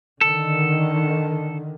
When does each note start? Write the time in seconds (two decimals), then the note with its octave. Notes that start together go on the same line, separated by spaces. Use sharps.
0.21 D3 D#3 A4